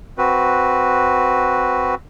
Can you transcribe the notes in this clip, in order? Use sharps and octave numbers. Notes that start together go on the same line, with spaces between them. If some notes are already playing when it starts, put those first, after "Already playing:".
C4 F#4 B4